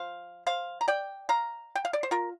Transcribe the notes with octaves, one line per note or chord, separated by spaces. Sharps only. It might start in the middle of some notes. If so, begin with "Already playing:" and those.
Already playing: F3 C5 F5
C5 F5
A#5
D5 G5
F5 A#5
G5
F5
D5
C5
F4 A#4